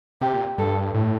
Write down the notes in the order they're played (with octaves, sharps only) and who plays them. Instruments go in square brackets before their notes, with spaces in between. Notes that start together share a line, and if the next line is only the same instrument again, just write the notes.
[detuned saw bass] C3 [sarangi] G4
[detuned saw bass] A#2
[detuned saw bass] G2 [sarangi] A4
[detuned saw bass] A2